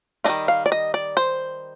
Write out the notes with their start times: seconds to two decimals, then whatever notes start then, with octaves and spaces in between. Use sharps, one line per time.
0.24 D#3 G3 D4 F4 D#5
0.48 F5
0.66 D5
0.72 D#5
0.94 D5
1.17 C5